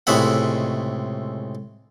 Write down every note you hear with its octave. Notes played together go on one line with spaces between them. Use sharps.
C#2 A2 C3 G#3 E5 F#5